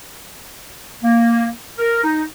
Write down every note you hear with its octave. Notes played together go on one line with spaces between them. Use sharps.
A#3
A#4
D#4